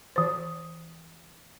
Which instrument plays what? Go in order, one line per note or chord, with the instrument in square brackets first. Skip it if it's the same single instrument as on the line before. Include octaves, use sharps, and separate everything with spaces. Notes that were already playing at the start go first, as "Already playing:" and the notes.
[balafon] E3 C5